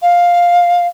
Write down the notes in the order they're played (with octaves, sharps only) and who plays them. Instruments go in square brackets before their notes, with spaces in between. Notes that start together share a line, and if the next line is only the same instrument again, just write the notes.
[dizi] F5